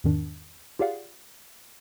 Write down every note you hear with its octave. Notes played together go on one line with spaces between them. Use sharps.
E2 G#2 D#3 D4
F4 G4 G#4 D5 F5 F#5